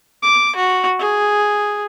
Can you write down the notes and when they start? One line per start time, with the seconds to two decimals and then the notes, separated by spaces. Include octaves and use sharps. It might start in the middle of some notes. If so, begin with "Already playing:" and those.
0.23 D6
0.56 F#4
1.00 G#4